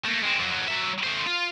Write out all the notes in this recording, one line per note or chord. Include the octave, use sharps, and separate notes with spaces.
A3 A#3
G#3 C4
F2 F#3
F#3 E5
A3 C5
F4